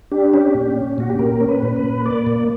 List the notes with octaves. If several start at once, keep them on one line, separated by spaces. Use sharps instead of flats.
D4 G4
C#4 G4
A#2
C#4
A#2 F#4
G4
A#2 A#4
C#4
B4
A#2
B4
A#2
A#3 D5
A#2